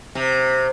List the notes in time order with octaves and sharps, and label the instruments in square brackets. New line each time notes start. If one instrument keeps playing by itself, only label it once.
[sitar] C3